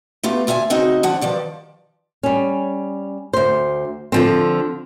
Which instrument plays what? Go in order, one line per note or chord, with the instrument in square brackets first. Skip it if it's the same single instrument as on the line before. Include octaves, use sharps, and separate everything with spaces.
[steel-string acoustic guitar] A3 B3 F4 G4
D2 F4 E5 G5 G#5
C#3 C4 D#4 F#4 D#5
D3 F3 F#5
G2 D#3 F3 D5
[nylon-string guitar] G3 C#4
D2 C5
D3 F3 C4